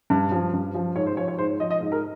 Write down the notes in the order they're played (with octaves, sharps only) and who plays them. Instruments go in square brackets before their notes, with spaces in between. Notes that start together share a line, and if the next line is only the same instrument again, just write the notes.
[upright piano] G2
F3
G2
F3
G#2 C#5
C5
F3 C#5
C#5
G#2 C5
F3 D#5
D#5
G#2
A#4